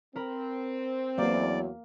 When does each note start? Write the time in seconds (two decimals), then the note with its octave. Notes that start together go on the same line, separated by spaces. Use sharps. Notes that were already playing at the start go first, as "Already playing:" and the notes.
0.16 C4 A#4 B5
1.18 E2 F#3 A#3 D5